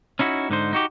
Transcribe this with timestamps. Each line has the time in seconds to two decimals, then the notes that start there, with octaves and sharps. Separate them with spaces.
0.19 C#4 D#4 E4 F#4
0.50 G#2 D3 D#4 C5
0.73 D#4 F#4 G4